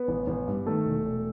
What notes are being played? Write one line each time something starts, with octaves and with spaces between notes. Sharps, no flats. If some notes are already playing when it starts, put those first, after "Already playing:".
Already playing: B3 B4
A1
A1
G2
D#3 A3 A4
E1
E1